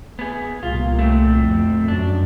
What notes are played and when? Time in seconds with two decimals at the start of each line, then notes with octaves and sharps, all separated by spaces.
0.19 B3 G#4
0.63 C2 A#2 F4
0.99 A3 C4
1.39 F2
1.88 F#2 D4